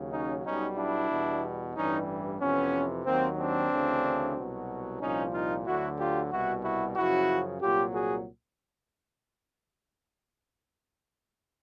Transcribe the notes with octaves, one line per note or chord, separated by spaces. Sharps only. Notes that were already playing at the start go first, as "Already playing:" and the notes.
Already playing: D#2 C#3 F#3
C#4 D#4
B1 B2 G3 C#4 D#4
D4 E4
E2 B2 G3
A1 G2 E3 G3 C#4 D#4
F2 C3 E3 B3 C#4
D#2 D#3 F#3 A#3 C4
C4 D4
D2 C#3 E3
C2 B2 F#3
C2 A#2 F3 C#4 D#4
D#4 F4
D2 D3 F#3 E4 F#4
F4 G4
C2 B2 G3 E4 F#4
E4 F#4
F#2 C#3 F3 E4 F#4
C2 A#2 F#3 F4 G4
F#4 G#4